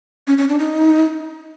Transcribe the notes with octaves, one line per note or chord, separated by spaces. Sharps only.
C#4
C#4
D4
D#4